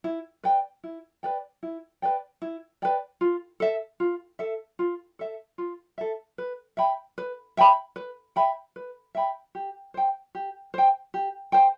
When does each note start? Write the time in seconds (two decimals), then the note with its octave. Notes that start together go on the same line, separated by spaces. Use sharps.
0.04 E4
0.43 B4 D5 G5
0.84 E4
1.23 B4 D5 G5
1.63 E4
2.02 B4 D5 G5
2.42 E4
2.82 B4 D5 G5
3.21 F4
3.60 A4 E5
4.00 F4
4.39 A4 E5
4.79 F4
5.19 A4 E5
5.58 F4
5.98 A4 E5
6.38 B4
6.77 E5 G5 B5
7.18 B4
7.57 E5 G5 B5
7.96 B4
8.36 E5 G5 B5
8.76 B4
9.15 E5 G5 B5
9.55 G4
9.94 C5 G5
10.35 G4
10.74 C5 G5
11.14 G4
11.52 C5 G5